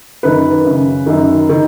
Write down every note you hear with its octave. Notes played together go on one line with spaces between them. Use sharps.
F#2 D#3 B4
F#2 C#3
F#2 D#3
D#3